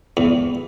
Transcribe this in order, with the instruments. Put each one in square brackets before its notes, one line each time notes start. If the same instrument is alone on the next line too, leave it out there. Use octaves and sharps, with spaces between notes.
[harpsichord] E2